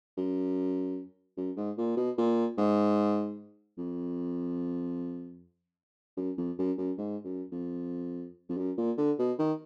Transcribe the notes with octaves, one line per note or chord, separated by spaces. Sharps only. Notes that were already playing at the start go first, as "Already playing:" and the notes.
F#2
F#2
G#2
A#2
B2
A#2
G#2
F2
F#2
F2
F#2
F#2
G#2
F#2
F2
F2
F#2
A#2
D3
B2
D#3